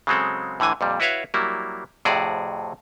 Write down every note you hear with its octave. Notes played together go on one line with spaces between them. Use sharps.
C#3 F#3 G#3 C4 A4
A2 D3 E3 G#5
F2 A#2 G3
E4 F#4 B4 C#5 E5 F5
F#3 G3 A#3 E4
F2 A2 C3 F#4 G#4 D5